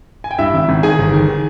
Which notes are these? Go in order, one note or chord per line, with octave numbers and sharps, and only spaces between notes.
G#5
G5
G2 E4 E5
G#1
G#1
D#3 G#4 G#5
G1
D#3